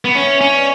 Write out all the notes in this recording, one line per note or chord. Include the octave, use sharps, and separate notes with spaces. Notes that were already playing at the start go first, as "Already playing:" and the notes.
B3
C#4 C#5 E5
C#4
B4 D5